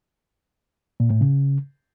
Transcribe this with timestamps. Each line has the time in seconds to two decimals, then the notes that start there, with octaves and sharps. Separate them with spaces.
1.00 A#2
1.10 A2
1.21 C#3